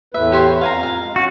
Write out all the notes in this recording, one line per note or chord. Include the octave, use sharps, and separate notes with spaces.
E2 A2 B4 E5
G4 C5 C#5
F2 F5 G#5 A#5
F5
G#3
C#4 F#4